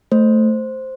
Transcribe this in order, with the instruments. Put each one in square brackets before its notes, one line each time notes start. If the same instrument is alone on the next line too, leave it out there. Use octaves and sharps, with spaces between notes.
[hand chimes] A3 C5